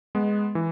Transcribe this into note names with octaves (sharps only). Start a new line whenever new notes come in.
G#3 B3
E3